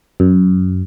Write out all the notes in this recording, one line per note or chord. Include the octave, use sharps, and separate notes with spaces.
F#2